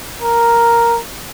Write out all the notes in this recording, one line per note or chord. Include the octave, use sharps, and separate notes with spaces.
A#4